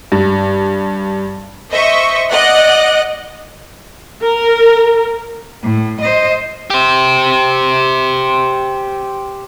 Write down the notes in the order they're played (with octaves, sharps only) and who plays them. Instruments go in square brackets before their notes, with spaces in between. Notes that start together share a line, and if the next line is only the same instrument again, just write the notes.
[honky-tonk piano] G2
[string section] C5 D#5 E5 C#6
D5 D#5 F#5 F#6
[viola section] A#4
[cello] A2
C5 D#5
[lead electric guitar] G4 C5